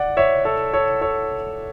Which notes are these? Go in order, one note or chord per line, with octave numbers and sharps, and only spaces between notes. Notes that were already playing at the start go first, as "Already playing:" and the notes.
Already playing: D5 F#5
C#5 E5
A4 C#5
A4 C#5
A4 C#5